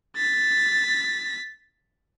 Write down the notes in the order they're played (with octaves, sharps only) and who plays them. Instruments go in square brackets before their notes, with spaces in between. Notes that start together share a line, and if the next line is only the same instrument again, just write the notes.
[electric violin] A6 B6